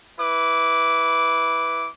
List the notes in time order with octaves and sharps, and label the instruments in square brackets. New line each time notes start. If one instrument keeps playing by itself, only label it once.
[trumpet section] E4 B4 D6